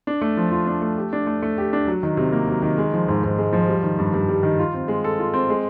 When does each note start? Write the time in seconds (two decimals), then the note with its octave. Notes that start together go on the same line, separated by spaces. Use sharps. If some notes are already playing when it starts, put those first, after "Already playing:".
0.07 D4
0.21 A3
0.37 F3
0.52 F4
0.67 D4
0.82 A3
0.97 G4
1.13 D4
1.27 A3
1.42 A3
1.58 G4
1.73 D4
1.87 F#3
2.03 D#3
2.17 C3
2.32 A#3
2.48 F#3
2.62 D#3
2.78 G#3
2.93 F3
3.08 G#2
3.24 G#2
3.38 G#3
3.53 F3
3.68 G3
3.83 D#3
3.98 G2
4.14 G2
4.28 G3
4.43 D#3
4.59 F4
4.74 C4
4.88 G#3
5.04 A4
5.19 F4
5.34 C4
5.50 G#3